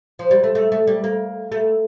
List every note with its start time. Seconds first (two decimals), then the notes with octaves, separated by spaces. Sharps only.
0.19 F3
0.31 G3
0.44 A3
0.55 A3
0.72 A3
0.87 G3
1.04 A#3
1.52 A3